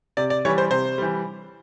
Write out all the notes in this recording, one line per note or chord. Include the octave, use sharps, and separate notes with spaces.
C3 D5
D5
E3 G3 C#5
C5
C3 C5
E3 G3